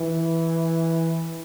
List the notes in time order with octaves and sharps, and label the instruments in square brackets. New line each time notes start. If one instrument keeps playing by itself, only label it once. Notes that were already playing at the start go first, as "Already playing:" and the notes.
Already playing: [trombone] E3